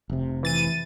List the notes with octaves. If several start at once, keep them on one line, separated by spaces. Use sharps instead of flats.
F1 C3
E3 A6 D#7